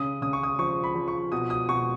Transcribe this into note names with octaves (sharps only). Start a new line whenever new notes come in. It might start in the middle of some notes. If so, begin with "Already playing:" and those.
Already playing: C#3 D#6
C#3 D#6
C#6
D#6
F3 C#6
B5
F3
C#6
B2 D#6
D#6
B2 C#6